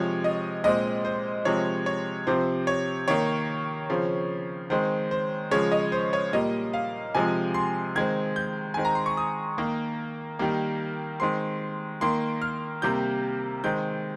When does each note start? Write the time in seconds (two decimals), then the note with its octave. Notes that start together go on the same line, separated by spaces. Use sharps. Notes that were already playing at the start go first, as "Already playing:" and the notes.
Already playing: C3 F3 G#3 C#5
0.24 D#5
0.64 A#2 G#3 C4 D#5
1.05 C5
1.45 C3 F3 G#3 C4 C#5
1.86 C#5
2.27 C3 F3 C4 C5
2.67 C#5
3.08 D#3 A#3 C#5
3.90 C#3 F3 C4
4.70 D#3 G#3 C4 C5
5.11 C5
5.51 C#3 F3 G#3 C#5
5.72 D#5
5.92 C5
6.13 C#5
6.33 A#2 G3 A#3 D#5
6.73 F5
7.15 C3 F3 G#3 G#5
7.54 C6
7.95 D#3 G#3 C4 G#6
8.36 G6
8.74 D#3 G#3 C4 G#5
8.85 A#5
8.95 C6
9.06 C#6
9.17 D#6
9.58 D#3 A#3
10.39 D#3 G3 A#3
11.20 D#3 G#3 C4 C6
12.01 D#3 A#3 C6
12.42 F6
12.82 C3 G3 A#3 G6
13.64 D#3 G#3 C4 G6